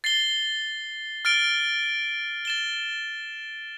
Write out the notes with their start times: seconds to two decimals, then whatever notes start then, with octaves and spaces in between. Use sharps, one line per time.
0.04 A6 C7 G7
1.25 F6 A6 D7 G7
2.45 A6 E7 G7